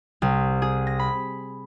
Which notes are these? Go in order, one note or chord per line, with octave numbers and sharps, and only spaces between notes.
C2
G#4
A#6
B5